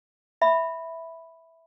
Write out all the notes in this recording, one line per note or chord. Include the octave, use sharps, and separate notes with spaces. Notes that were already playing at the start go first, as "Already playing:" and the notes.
E5 B5